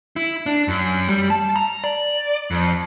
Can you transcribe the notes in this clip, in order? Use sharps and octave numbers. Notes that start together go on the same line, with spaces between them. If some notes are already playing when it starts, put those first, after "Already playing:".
E4
D4
F#2
G3
A5
A#5
D5
F2